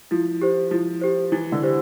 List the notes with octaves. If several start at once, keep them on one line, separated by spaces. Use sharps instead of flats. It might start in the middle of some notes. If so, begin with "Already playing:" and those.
F3 E4
G4 C5
F3 E4
G4 C5
E3 E4
D3
G4 C5